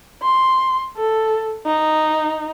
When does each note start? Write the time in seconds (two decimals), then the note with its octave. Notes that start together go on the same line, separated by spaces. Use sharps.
0.23 C6
0.97 A4
1.67 D#4